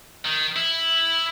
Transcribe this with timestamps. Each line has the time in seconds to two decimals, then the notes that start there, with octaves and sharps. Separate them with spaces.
0.25 D#3
0.56 E4